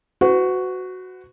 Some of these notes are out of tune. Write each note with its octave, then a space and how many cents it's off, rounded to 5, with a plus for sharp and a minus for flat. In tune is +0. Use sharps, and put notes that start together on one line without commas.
F#4 +0 B4 +45